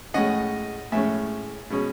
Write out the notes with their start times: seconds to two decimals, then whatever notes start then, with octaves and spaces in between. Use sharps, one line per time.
0.14 A2 G#3 C#4 D#5 F#5
0.92 A2 G#3 C#4 E5 G#5
1.70 B2 G#3 C#4